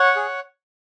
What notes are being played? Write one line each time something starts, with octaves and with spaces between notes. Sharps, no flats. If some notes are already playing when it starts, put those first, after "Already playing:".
Already playing: C#5 F#5
G#4